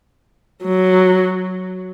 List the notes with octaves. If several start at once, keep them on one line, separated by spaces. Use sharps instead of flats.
F#3